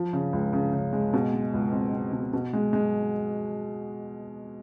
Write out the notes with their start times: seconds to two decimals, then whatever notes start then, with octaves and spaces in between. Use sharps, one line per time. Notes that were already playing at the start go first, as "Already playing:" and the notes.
Already playing: F3
0.13 C#3
0.33 C#2
0.53 C#3
0.74 C#3
0.93 G#3
1.13 B2
1.34 G#3
1.53 C#2
1.73 C4
1.93 C4
2.13 B2
2.33 B2
2.53 G#3
2.73 G#3